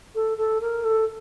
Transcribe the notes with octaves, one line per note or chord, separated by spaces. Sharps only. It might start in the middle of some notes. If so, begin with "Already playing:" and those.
A4
A4
A#4
A4